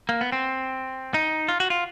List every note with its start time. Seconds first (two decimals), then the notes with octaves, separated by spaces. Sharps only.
0.09 A#3
0.21 B3
0.32 C4
1.14 D#4
1.49 F4
1.60 F#4
1.70 F4